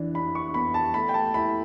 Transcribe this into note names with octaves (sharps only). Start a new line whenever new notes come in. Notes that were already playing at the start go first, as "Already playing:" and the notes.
Already playing: E3 D4
D4 B5
C#6
B3 B5
A5
A3 B5
G5
A5
E4 B5